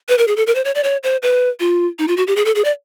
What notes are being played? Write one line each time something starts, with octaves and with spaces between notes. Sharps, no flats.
B4
A#4
G#4
A4
A#4
C5
C#5
D5
C#5
C5
B4
F4
D#4
F4
F#4
G4
G#4
A4
G#4
D5